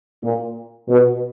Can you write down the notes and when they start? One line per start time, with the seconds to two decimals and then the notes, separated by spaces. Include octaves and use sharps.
0.22 A#2
0.87 B2